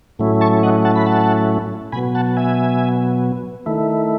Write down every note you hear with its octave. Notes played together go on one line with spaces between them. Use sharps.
A2 F#3 A3 C#4 E4
A5 C#6
D#5 F#5
F#5 A5
B5
F#5 A5
B2 F#3 B3 G#5 B5
F#5 A5
E5 G#5
D#3 A3 E4